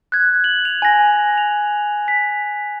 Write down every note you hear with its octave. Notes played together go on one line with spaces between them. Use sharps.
F#6 G#6
F#7
F7
G#5 A#6
F7
B6